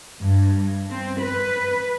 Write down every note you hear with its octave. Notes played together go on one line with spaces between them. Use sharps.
G2
C4
B4